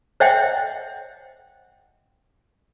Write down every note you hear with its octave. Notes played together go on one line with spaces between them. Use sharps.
C5 C#5 D#5 E5 F#5 G5